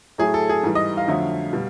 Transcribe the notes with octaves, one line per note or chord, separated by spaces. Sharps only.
A2 F#3 A3 G#4
A4
G#4
G#2 E3 G3
D#5
F5
F2 D3 F#3 A3
B2 G3